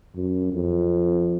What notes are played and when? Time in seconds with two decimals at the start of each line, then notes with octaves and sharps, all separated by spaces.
0.16 F#2
0.53 F2